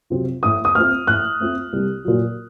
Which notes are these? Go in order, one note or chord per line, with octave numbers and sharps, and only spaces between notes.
C3 F#3 C4 F4
A2 D#6
D#6
A3 C4 F4 F6
A2 F#6
A3 C4 F4
C2
A#2 F#3